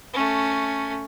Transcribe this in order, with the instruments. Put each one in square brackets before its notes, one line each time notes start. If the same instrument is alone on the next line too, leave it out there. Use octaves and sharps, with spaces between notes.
[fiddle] A3 C#4